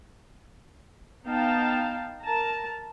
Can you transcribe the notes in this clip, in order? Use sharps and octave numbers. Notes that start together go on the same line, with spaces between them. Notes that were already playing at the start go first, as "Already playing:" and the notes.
B3 D#4 F5 G5 A5
A#4 A5 A#5